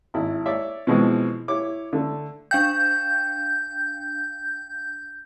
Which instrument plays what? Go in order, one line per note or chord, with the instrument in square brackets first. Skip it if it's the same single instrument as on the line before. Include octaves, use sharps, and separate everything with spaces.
[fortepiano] G#1 E4
C#5 D5 E5
B2 E3 F3 G#3 C4
E4 C#5 D6
D3 A3
[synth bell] D4 F5 G5 [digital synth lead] G6